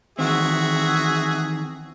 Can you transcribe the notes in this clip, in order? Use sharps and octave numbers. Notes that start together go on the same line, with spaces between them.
D#3 E3 C4 F#4 G#4 E5